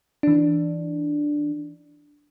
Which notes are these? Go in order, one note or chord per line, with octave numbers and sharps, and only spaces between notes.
E3 D4